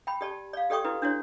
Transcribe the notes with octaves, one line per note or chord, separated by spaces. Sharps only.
G5 B5
G4 D5 A5
D5 F5
G4 A4 D5 G5 C#6 D#6
E4 F#4 B4
D4 E4 F#4 C#5